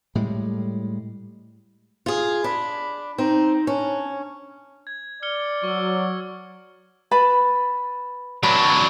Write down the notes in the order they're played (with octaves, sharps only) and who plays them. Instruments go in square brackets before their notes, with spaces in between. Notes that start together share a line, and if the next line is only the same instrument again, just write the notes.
[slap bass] A2 G3 G#3
[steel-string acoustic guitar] F4 G#4
[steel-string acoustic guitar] D4 [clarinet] B5
[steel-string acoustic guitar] C4 [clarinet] D#4
[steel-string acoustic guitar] C#4 [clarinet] D4
[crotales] G#6
[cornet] D5 [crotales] F6 C#7 G7
[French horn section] F#3 [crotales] C#6 E6
[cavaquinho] B4 A5 B5
[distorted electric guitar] F#3 D4 [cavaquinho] B5